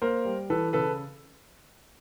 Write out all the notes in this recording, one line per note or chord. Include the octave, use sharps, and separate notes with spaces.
A#3 A#4 C5
G3
E3 A4 B4
C#3 A4 B4